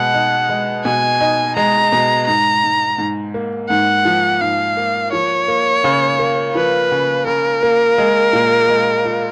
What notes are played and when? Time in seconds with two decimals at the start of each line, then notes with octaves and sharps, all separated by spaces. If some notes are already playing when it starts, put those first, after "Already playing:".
Already playing: B2 G#3 F#5
0.14 D#4
0.49 G#3
0.85 B2 G#5
1.21 D#4
1.56 G#3 A#5
1.92 B2
2.27 G#2 A#5
2.64 G#2
2.98 G#2
3.34 A#3
3.70 G#2 F#5
4.05 F3
4.41 G#2 F5
4.77 A#3
5.13 F3 C#5
5.48 A#3
5.84 C#3
6.19 A#3
6.55 F3 B4
6.92 C#3
7.27 C#3 A#4
7.63 A#3
7.98 G#3
8.33 A#2
8.69 G#3
9.05 F4